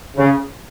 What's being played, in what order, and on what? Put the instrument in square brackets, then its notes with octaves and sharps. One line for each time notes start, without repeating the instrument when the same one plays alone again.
[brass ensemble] C#3